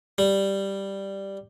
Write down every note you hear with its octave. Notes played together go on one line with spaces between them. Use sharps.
G3